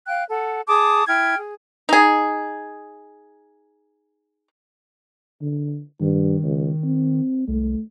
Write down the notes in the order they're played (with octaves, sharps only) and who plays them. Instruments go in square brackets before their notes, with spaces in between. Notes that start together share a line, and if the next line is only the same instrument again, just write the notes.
[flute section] F5 G5 F#6
A4 F#5
G#4 A5 D6 D#6
E4 G5 F6 G#6
G#4
[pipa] D#4 G#4
[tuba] D3
[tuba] G2 [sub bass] D#3
[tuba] C#2
C4
[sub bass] C2 [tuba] A3